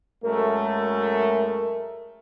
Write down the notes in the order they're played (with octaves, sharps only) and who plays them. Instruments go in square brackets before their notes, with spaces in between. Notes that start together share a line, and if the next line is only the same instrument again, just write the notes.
[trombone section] F#2 G#3 A3 [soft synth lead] A#4